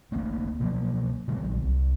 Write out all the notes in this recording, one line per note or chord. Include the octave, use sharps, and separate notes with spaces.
D2 A3 A#3 C4
B2 F3 F#3 A#3
B2 D3 G3 G#3
A#1 F#3
C2